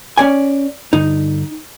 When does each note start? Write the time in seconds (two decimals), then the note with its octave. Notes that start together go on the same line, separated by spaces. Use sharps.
0.18 C#4 D5 G#5
0.93 G2 D3 D#4